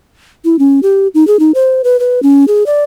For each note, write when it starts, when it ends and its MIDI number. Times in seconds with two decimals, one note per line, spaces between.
0.45 0.59 64
0.59 0.80 61
0.83 1.08 67
1.14 1.26 63
1.27 1.39 68
1.39 1.52 63
1.55 1.82 72
1.84 1.99 71
2.00 2.22 71
2.23 2.45 61
2.48 2.66 68
2.66 2.84 74